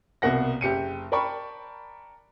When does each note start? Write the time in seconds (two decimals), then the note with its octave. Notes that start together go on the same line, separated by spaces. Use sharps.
0.22 C2 B2 A#3 F#5 A#6
0.61 F#1 G4 C#7 D#7
1.12 A#4 D5 G5 A5 B5 C#6